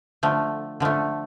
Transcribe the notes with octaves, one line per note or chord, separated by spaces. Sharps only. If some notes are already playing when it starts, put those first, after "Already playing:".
D3 F3 A3
D3 F3 A3